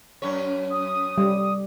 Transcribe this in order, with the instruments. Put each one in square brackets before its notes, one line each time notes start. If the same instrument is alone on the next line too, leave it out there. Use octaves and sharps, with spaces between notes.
[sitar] F#2 C#4 C#5
[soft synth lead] D#6
[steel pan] G3